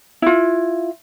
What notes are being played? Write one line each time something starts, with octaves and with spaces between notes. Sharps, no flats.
E4 F4